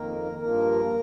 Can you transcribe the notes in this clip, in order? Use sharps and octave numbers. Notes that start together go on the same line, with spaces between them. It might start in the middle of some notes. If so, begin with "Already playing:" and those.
Already playing: F2 D#3 A#3 A#4
G2 F3 A#3 A#4